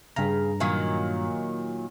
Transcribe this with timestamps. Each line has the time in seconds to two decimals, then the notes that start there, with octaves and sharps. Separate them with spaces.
0.16 G2 C#3 A#5
0.60 A#2 D#3 F#3